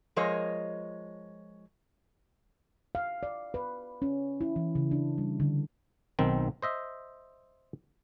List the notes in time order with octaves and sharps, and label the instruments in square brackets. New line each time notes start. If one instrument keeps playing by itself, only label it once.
[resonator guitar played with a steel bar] F3 G#3 A#4 C#5 D#5
[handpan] F5
D5
B4
C#4
E4
E3
C#3
D4
G3
D3
[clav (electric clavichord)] B1 D#3 C4
C5 D#5 E5